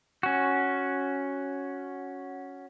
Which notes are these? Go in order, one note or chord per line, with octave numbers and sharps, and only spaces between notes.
C#4 F#4